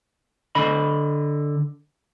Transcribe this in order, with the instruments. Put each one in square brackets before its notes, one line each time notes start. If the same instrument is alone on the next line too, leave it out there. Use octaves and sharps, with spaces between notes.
[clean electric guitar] D3 D#5 B5